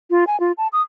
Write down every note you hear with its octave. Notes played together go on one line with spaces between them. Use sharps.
F4
G#5
F4
A5
D#6